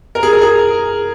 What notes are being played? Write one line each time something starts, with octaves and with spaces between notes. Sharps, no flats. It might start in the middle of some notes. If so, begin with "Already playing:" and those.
A#4
G#4
A#4
G#4